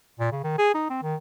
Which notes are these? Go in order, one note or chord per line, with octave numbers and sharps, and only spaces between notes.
A#2
C#3
D#3
G#4
D#4
C4
D#3